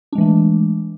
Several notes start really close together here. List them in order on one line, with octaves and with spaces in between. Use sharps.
D4 G#3 E3 A3